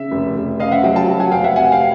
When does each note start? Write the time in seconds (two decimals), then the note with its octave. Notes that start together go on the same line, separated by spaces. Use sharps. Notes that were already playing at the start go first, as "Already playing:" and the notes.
Already playing: C#3 E5
0.11 F1
0.36 F1
0.60 C#3 D#5 F5
0.71 E5 F#5
0.83 F#3 F5 G5
0.96 G5 A5
1.08 F#3
1.20 F#5 G#5
1.31 F1 F5 G5
1.44 E5 F#5
1.56 C3 F#5 G#5
1.72 F5 G5